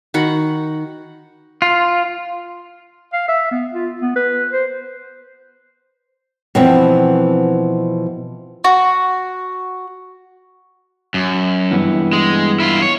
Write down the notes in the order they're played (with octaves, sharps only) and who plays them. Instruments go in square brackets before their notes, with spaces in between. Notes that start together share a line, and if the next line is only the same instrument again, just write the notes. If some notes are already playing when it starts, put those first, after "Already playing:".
[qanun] D#3 F#4 F#5 B5
[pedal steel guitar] F4
[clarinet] F5
E5
B3
F4
B3
B4
C5
[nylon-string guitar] B2 E3 F3 B3 C4
[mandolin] F#4
[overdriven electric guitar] F#2
[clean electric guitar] G2 E3 B3
[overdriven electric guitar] G#3
E4 F4
C#5